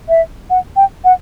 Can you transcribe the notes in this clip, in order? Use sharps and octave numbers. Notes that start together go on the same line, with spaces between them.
E5
F#5
G5
F#5